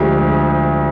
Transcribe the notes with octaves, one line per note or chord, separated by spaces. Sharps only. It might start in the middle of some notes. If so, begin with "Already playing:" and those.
Already playing: D2 D3 F3 G#3 G4
G#4